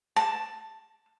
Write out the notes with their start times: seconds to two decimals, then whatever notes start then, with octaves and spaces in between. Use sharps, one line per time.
0.16 A5